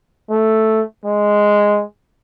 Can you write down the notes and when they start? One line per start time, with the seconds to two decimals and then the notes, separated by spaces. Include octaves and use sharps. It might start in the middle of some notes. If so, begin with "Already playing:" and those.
0.30 A3
1.05 G#3